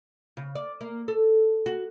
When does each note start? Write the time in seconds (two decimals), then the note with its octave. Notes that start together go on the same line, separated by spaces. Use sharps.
0.37 C#3
0.55 D5
0.81 A#3
1.08 A4
1.66 F#4